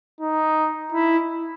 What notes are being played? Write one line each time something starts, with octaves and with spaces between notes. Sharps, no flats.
D#4
E4